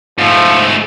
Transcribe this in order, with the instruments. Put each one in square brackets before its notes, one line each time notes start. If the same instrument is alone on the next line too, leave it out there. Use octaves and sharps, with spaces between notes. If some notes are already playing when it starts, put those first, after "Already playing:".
[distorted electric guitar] G#2 A3 [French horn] F3